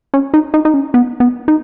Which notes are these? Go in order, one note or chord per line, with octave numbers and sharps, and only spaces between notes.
C#4
D#4
D#4
D#4
C#4
B3
B3
D#4